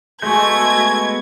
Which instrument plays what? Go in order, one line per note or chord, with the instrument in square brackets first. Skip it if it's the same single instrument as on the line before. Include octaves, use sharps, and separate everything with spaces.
[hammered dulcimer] G#3 [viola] A3 F#4 [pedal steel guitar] B3 D#5 G6 [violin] G#6